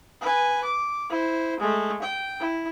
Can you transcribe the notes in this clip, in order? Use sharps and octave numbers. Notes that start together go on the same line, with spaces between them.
B4 G#5
D6
E4 C5
G#3 A3
G5
E4